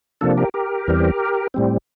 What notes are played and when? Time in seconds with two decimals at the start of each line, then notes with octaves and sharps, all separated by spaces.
0.21 C3 F3 A#3 D4 A4
0.37 G4 A#4
0.54 G4 A#4
0.88 E2 E3 G3 C4
1.54 A2 G3 C4